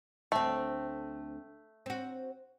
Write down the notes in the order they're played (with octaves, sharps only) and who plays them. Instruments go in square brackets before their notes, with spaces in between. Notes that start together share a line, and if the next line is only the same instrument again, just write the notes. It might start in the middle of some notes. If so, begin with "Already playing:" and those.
[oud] D2 C4 [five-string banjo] A3
[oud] C4 F#4